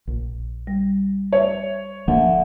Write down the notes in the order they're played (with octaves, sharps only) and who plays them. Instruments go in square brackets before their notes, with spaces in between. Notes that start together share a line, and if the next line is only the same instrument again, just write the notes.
[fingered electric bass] A#1
[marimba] G3
[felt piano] C#5 [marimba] D5 E5
[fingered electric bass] D1 F3 A#3 [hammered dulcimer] D3 E5